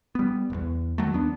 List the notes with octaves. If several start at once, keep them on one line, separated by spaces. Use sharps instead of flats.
G3 B3
E1 E2
D#3 F#3 A3
D#2 B3 D4